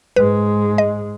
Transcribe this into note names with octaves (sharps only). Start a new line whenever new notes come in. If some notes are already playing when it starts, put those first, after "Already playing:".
G#2 G#3 B4
D#5